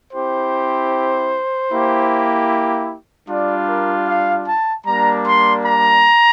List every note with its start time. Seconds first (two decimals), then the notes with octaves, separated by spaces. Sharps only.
0.13 C4 E4 G4 C5
1.71 A#3 E4 G4
3.29 G3 D4 F4 D5
3.67 A#4
4.07 F5
4.46 A5
4.85 G3 A#3 D4 A#5
5.25 C6
5.65 A#5